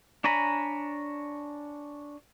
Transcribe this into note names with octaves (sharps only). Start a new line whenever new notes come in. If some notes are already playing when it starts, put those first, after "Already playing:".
D4 C#5 G#5 A#5 B5